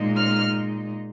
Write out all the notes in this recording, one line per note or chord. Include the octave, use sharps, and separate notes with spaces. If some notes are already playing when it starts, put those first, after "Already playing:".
Already playing: A#2 G#3 D#4
F6